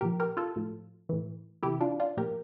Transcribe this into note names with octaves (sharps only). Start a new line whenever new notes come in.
A#2 F3 G4 A#4
G4 A#4
F4 A4
A2 F3
A2 E3
C3 E3 E4 G4
D4 F4
D4 F4
A#2 F3 G4 A#4